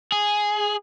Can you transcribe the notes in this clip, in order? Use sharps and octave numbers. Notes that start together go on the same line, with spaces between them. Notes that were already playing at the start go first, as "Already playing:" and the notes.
G#4